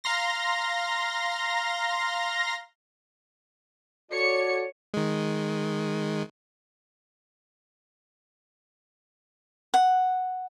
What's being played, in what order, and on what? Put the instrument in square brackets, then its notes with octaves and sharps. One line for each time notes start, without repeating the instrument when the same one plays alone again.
[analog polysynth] F5 A#5 C6 A#6
[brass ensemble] F#4 A4 D5 [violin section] C#5 C#7
[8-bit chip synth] D#3 G#3
[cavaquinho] F#5